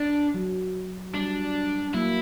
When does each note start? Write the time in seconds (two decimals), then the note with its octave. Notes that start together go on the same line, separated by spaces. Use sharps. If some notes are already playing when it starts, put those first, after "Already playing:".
Already playing: D4
0.34 F#3
1.14 G3 D4
1.94 F#3 A#3 E4